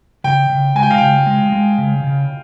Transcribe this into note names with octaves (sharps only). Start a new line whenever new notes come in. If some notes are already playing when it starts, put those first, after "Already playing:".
C#3 G5
C#3
G#3 G#5
G5
F5
C#3 G5
G#3
G#3
C#3
C#3